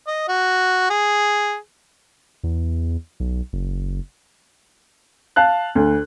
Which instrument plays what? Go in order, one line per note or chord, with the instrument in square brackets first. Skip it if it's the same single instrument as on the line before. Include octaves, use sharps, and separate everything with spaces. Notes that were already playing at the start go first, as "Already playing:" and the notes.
[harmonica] D#5
F#4
G#4
[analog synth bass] E2
B1
F#1
[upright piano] F5 A5 F#6
D2